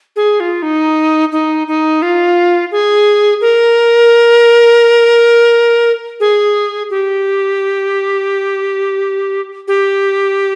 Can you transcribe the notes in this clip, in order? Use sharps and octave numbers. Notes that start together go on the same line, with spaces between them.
G#4
F4
D#4
D#4
D#4
F4
G#4
A#4
G#4
G4
G4